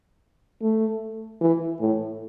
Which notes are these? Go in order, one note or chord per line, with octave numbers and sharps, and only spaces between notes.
A3
E3
A2